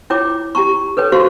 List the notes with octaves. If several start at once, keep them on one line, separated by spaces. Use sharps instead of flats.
E4 F4 C#5 G5 D6
G4 G5 A#5 C#6
A4 B4 C#5 G5
F4 F#4 C5 F5 C6 C#6